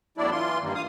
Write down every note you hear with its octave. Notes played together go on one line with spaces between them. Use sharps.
E2 A2 F#3 D4 E4 D5
E3 F4 C6
G2 D#3 G3 A#3
F5 D#6